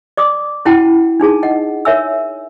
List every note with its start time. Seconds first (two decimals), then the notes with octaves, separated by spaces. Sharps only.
0.17 D5 D6 D#6
0.65 C#4 E4 F#4 F#5 G5 A5
1.20 D4 D#4 G#4 A5
1.43 D#5 F#5
1.85 A#4 C#5 E5 G#5 E6